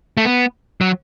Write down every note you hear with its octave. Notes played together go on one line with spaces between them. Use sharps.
A3
B3
F#3